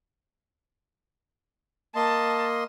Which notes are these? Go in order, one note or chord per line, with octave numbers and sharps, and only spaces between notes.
A#3 D#5 A5 C6